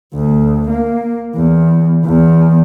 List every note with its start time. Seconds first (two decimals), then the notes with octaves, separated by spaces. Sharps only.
0.15 D2
0.70 A#3
1.35 E2
2.06 E2